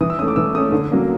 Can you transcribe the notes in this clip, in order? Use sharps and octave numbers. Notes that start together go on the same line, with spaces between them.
E3 D#6
E6
A3 C#4 D#6
D6
E3 E6
A3 C#4 D#6
D3
F#3 A#3 C#4